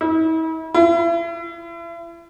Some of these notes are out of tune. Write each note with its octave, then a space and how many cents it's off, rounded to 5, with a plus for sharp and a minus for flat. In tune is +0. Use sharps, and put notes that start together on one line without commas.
E4 -45
E4 +35